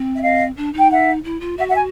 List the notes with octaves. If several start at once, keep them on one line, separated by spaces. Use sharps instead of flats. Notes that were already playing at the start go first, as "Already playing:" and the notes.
Already playing: C4
E5
D#5 F5
D4
D#4
G5
E5 F#5
E4
F4
F#4 E5 F#5
E5 F#5
G#5